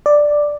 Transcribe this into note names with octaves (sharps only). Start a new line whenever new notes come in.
D5